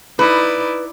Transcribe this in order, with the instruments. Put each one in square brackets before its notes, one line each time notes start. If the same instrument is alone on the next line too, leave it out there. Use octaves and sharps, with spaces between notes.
[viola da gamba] D#4 E4 D5 [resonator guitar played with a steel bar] B4